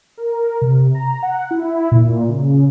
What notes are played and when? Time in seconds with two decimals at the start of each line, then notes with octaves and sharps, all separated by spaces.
0.17 A#4
0.62 C3
0.95 A#5
1.23 F#5
1.51 E4
1.91 A#2
2.29 C#3